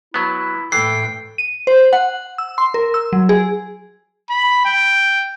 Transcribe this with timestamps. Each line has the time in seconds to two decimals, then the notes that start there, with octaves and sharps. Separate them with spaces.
0.14 F#3 B3 E4
0.72 A2 E3 A4 G5 C7
1.38 D#7
1.67 C5
1.93 F#5
2.38 E6
2.58 C6
2.74 A#4
2.94 E6
3.13 F#3
3.29 G#4
4.30 B5
4.65 G5